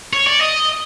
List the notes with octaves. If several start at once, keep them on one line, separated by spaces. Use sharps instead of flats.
C#5
D5
D#5